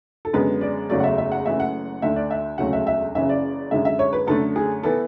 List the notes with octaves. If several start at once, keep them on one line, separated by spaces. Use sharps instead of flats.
A4
F#2 D3 G#3 B3 B4
D5
F#1 E2 C#3 F#3 A3 D5
F#5
E5
E5
F#5
F#1 F#2 E3 A3 E5
F#5
D2 D3 A3 E5
D5
E5
E1 D2 C#3 F#3 A3 F#5
E5
E5
F#1 F#2 C#3 E3 E5
D5
F#2 D3 G#3 E5
E5
C#5
B4
F#2 D3 A3 A4
G#4
E3 B3 A4